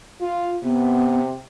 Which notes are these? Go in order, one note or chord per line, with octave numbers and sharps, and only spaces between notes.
F4
C3 B3